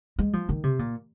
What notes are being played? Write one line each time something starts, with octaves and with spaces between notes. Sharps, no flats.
G#3
F3
D#3
C3
A#2